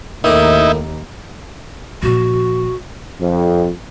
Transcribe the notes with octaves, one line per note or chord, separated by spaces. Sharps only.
D#2 A2 A#3 D#4 E4
A#2 F3 F#4
F2